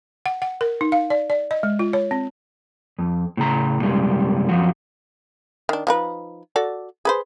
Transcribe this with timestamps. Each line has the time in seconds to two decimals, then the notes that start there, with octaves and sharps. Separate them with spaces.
0.26 F#5
0.42 F#5
0.61 A#4
0.81 D#4
0.92 F5
1.10 D5
1.30 D5
1.51 D#5
1.63 G#3
1.79 F4
1.93 C#5
2.11 C4
2.99 F2
3.37 A2 C#3 A#5
3.82 C2 F#2 G3 G#3
4.49 F#2 F3 F#4
5.69 D#3 D4
5.87 F3 D#4 B4
6.56 F#4 A4 D5
7.05 G#4 B4 C5